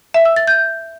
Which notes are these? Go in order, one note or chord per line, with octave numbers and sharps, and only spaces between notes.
E5
E6
A6
G6